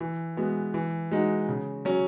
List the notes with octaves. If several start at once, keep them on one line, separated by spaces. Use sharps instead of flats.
E3
G#3 B3 F#4
E3
G#3 D#4 F#4
C#3
F#3 C#4